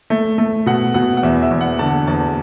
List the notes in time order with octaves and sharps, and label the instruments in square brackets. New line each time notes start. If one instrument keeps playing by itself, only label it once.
[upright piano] A3
A3
B2 F#5
B2 F#5
F#5
E2 E5
E5
E2
F#5
D3 A5
E2 A5